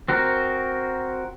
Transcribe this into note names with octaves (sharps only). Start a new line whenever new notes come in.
C4 F#4 A#4